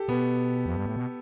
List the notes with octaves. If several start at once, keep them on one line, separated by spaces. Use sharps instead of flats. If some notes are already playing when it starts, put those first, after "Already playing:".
Already playing: G4 A4
B2 B3
F2
G2
A2
B2